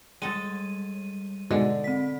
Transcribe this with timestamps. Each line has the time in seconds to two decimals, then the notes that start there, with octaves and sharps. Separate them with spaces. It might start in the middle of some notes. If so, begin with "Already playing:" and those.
0.22 G3 G#3 A4 D#7
1.51 G#2 B2 D3 G#3
1.84 C4 B6